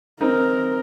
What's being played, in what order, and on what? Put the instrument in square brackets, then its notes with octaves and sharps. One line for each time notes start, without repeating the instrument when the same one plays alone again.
[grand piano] C4 D#4 [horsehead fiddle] A#4